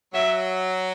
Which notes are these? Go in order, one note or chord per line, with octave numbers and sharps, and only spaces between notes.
F#3 E5